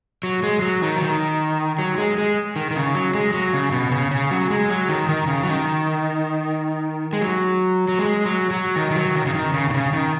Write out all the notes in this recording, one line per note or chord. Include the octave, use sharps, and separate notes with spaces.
F#3
G#3
F#3
D#3
F#3
D#3
F#3
G#3
G#3
D#3
D#3
C#3
F#3
G#3
F#3
C#3
B2
C#3
C#3
F#3
G#3
F#3
D#3
D#3
C#3
F#3
D#3
G#3
F#3
F#3
G#3
F#3
F#3
D#3
D#3
F#3
D#3
C#3
D#3
C#3
B2
C#3
D#3